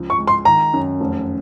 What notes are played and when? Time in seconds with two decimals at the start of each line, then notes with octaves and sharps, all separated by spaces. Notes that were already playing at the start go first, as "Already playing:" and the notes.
Already playing: C#2 F3
0.10 C#6
0.18 G#3
0.28 C6
0.45 D#3 A#5
0.73 F#2
1.01 F1